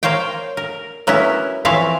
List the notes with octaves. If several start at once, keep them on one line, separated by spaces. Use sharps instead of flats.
A#3 C5 C#5 F5 G5
A#4
F#3 A#3 B3 C#4 E4
E3 F3 C4 C#5 E5 F5